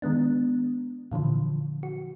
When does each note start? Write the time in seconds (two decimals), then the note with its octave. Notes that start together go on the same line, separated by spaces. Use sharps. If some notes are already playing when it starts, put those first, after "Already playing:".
0.02 D#3 G#3 B3 D4
1.12 A#2 D3 E3 F3
1.83 F#4